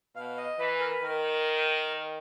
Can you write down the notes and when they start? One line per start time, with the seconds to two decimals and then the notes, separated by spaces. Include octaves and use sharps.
0.15 B2 F5
0.37 D#5
0.58 E3 B4
0.80 A#4
0.91 B4
1.01 D#3 A#4